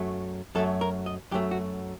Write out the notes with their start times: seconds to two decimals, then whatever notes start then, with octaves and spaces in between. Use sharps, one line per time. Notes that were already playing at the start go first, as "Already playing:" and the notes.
Already playing: F#2 F#3 A3
0.55 F#2 F#3 A3 A4
0.81 A#4
1.06 D#5
1.31 F#2 F#3 A3 G4
1.51 F#4